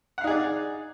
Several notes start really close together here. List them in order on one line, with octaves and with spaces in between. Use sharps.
F#5 F5 D#4 G#4 D5